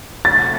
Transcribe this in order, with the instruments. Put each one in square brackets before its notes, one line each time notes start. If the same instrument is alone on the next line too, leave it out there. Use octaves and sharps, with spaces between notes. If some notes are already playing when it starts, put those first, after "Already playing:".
[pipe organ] C3 F3 A3 C#4 F#4 [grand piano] A6